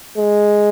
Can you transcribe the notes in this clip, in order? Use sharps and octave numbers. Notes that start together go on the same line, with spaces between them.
G#3